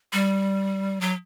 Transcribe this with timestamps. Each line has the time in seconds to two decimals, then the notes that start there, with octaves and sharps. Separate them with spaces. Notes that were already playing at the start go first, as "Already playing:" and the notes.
0.13 G3
1.01 F#3